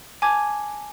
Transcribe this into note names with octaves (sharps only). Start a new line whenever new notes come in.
G#5 A5 D6 G#6